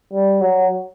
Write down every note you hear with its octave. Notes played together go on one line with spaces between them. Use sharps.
G3
F#3